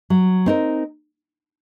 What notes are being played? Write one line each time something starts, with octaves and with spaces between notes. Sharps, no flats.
F#3
C4 D#4 A#4